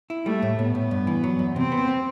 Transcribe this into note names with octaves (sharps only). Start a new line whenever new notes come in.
E4
G3 A3
A2
A2 B3
A2
G2
E3
F#3
E2
C3 C4
B3
C4